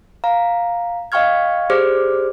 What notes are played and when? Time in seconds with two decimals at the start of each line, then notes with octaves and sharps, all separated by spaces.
0.24 F5 A#5
1.12 D#5 F5 G5 C#6 F6 G#6
1.70 G4 G#4 C5 D5 D6 F6